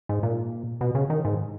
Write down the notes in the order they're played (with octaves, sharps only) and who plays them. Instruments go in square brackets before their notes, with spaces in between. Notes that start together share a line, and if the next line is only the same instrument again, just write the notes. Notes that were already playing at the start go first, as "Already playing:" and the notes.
[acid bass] G#2
A#2
B2
C#3
D#3
G#2